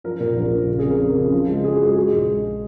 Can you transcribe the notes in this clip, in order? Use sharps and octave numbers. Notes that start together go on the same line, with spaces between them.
F3 A#4
A#2 A#4
A#1
A#1
C#3
G#4
F2
A#4
F3
C#3
F3
G#3
F3 G#4
F#4
G#3
G#4
G#3 G#4
A#1
G#3